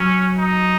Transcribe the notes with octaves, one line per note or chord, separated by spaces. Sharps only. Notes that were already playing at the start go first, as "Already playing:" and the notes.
Already playing: F#3 C#4
D#4